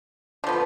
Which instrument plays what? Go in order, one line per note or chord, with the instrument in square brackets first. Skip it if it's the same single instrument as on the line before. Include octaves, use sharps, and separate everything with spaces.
[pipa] D3 F3 B3